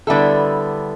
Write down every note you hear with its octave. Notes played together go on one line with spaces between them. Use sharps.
D3 G3 B3 E4 A4